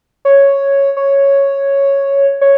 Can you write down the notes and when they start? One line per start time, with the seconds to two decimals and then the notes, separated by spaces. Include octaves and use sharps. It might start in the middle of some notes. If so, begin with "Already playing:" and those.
0.25 C#5
0.97 C#5
2.41 C#5